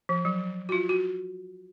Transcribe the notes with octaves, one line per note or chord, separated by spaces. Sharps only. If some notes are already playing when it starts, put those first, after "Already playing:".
F3
F#3
F#4
F4
F#4